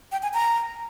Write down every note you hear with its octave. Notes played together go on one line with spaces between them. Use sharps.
G5
G#5
A#5